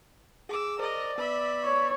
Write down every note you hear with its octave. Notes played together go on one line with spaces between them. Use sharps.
G#4 D6 E6
A#4 C5 D5 D#5
B3 B4 E5 B5 E6
C#5